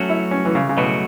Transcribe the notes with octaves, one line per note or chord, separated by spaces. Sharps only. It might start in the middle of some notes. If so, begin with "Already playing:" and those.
Already playing: F#3 A3 C#4 F#4
E4
C#4
E3
C#3
C#3
B2 F#3 A3 F#4